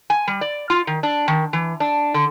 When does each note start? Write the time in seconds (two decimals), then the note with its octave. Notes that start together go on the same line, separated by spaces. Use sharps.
0.10 G#5
0.27 G3
0.41 D5
0.70 F4
0.87 D#3
1.03 D4
1.28 D#3
1.53 E3
1.80 D4
2.14 D3